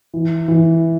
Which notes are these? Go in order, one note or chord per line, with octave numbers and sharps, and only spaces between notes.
E3
E3